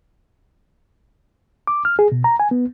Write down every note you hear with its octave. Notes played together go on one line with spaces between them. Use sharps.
D6
F6
G#4
B2
A#5
G#5
B3